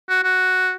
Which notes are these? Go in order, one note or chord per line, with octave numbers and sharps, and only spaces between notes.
F#4
F#4